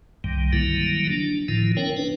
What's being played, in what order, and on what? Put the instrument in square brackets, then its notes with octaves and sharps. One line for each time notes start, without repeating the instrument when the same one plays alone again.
[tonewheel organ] C2 G2 D#3 G3
D3 D#3 F#3 G3 A#3 E4
D4
A2 D3 D#3 F3 E4
B3 C#4 A#4 C#5 G5
D4 D#4 B4